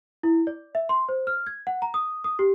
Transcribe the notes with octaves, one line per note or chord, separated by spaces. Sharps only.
E4
D5
E5
C6
C5
F6
G#6
F#5
A#5
D#6
D#6
G4